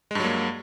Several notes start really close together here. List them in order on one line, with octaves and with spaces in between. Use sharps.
G#3 G2 F#3 A#3